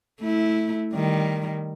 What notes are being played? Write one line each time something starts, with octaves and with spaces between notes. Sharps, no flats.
A3 E4
D#3 G3